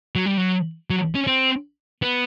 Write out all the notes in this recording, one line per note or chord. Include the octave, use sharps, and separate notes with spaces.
F#3
G3
F#3
F#3
C#4
C4
B3